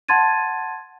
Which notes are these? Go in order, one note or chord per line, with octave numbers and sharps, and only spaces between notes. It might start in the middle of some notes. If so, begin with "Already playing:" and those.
F#5 A5 C6 G#6 A6 D#7